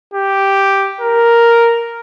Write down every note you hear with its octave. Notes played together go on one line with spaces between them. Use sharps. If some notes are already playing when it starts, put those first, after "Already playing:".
G4
A#4